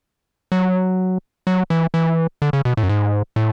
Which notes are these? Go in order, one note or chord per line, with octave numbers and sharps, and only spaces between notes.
F#3
F#3
E3
E3
D3
C#3
B2
A2
F#2
G#2
A2